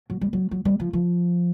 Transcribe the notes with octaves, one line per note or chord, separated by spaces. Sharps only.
F#3
G3
F#3
F#3
G3
F3
F3